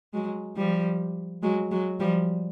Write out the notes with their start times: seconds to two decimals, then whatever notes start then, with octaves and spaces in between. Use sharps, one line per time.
0.13 F#3 G#3
0.57 F3 G3
1.42 F#3 G#3
1.71 F#3 G#3
2.00 F3 G3